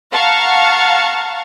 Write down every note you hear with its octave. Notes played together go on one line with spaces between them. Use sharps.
F5 F#5 A5 A#5 C#6 F6